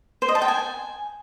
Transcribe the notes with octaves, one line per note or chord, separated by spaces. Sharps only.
C5
D#5
A5
G5
G#5